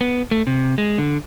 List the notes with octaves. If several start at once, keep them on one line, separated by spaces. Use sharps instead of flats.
B3
A3
C3
G#3
D3